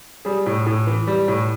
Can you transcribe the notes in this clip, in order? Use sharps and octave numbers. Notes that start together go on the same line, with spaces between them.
G3 G#4
A2
A2
E3
G3
A2